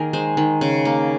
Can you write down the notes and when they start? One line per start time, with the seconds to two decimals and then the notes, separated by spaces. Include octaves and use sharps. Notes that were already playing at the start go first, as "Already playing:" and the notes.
Already playing: D#3 A#3 G#4 A#4
0.13 G#3 C5
0.37 D#3
0.61 C#3
0.85 A#3